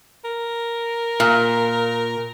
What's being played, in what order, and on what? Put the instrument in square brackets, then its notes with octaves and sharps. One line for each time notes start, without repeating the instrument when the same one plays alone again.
[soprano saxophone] A#4
[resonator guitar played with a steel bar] A#2